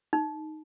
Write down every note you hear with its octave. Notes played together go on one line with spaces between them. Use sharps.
D#4